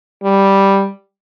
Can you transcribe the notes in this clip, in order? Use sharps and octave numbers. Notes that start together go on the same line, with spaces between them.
G3